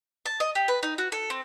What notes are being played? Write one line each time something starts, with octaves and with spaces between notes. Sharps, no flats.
A5
D#5
G4
B4
D#4
F#4
A4
C4